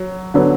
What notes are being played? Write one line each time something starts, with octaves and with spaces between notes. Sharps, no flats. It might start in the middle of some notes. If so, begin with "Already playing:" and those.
Already playing: F#3
D3 F#3 B3